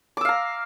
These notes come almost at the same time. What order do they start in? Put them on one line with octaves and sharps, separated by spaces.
D6 E6 F5 A#5